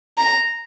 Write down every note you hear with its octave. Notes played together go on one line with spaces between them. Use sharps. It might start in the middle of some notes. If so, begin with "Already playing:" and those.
A#5